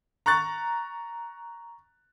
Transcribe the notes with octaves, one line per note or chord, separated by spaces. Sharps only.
A#5 C#6 F#6 A6